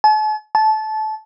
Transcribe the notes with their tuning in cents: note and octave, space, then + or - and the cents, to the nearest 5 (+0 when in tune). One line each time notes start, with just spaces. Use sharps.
A5 -45
A5 -20